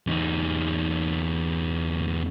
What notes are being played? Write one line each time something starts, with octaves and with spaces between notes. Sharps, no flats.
E2 D#4